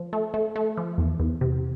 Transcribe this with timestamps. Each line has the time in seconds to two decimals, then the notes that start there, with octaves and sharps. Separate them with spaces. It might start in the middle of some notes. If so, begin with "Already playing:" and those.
Already playing: F3
0.13 A3
0.34 A3
0.56 A3
0.78 F3
0.98 E2
1.20 E2
1.41 C3